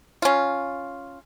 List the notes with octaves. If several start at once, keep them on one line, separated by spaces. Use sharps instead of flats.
C#4 F4